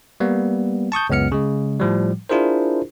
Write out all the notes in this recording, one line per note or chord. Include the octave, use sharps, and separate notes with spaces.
G3 A#3 B3
A5 C#6 D#6 G6
C#2 F#2 B3 F6 C#7
C#3 G#3
A2 F3 G3
D4 E4 F4 G#4 A#4 C5